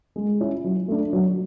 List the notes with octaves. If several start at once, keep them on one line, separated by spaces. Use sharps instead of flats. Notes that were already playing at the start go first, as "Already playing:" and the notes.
G#3
C#4 E4
F#3
A3 D4
F#3